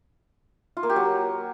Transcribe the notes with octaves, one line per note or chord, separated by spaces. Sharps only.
F4
A#3
G4
F#3